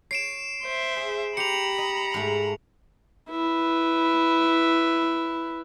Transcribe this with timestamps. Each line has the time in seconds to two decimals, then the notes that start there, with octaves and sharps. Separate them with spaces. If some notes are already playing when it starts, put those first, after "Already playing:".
0.11 C#5 C7 D7 E7
0.62 C5 E5
0.96 G#4
1.37 G4 C5 A#5 B5 C#7 F7
1.78 D#5
2.14 G#2 A3
3.30 E4 B4